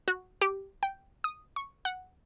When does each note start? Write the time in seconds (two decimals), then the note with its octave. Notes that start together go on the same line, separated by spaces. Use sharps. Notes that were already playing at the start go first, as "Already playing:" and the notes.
0.08 F#4
0.41 G4
0.83 G5
1.24 D#6
1.56 C#6
1.85 F#5